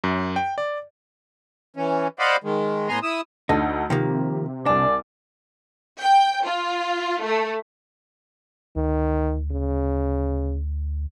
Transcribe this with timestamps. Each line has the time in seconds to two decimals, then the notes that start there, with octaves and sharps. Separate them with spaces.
0.04 F#2
0.36 G5
0.58 D5
1.76 E3 C#4
2.19 C5 D5 D#5 F5 F#5 B5
2.44 D#3 G#3
2.89 A2 B3 G#5 A#5 C6
3.03 E4 D#6 E6
3.49 D2 D3 D#4 A4
3.90 C3 D#3 F3 A#3 G4
4.66 C2 D4 D5 G#5
6.00 G5
6.46 F4
7.22 A3
8.76 D2 D#3
9.51 C#3